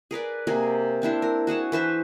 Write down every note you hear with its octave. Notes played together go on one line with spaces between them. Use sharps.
G#4 A#4 B4 D5
C3 A#3 G#4 A#4
C4 D4 E4 C5
A#4
F#4 G#4 F#5 A5
E3 B4 C5 E5